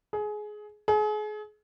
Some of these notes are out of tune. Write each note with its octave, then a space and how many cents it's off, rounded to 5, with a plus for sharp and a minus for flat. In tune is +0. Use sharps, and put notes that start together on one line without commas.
G#4 +20
G#4 +35